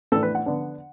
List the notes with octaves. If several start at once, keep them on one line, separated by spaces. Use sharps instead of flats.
A2 E3 D4 A4
B4
F#5
D3 B3 D4